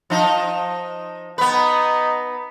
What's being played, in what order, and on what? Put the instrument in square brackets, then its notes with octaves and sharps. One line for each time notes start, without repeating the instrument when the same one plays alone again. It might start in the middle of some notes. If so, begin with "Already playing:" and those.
[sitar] F3 D#4
[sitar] B3 B4 [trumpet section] D#4